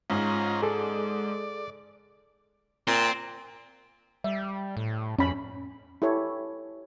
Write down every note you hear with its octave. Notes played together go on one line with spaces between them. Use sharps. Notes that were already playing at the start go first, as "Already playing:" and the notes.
G#2 C#4 F4 A#5
G#4 A4 D5
A#2 C4
G3 E5
A2
F2 C#4 B5
E4 G4 A4 C#5